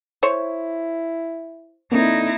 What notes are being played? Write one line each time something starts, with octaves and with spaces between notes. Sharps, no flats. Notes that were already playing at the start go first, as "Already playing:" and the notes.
E4 C5 C#5
D3 A#3 C4 D#4 E4